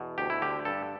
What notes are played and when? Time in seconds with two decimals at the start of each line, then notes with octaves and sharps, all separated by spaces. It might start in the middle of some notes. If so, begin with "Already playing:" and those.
Already playing: E2 B2
0.18 D2 G4
0.30 E4
0.42 D3 G4
0.65 G2 A4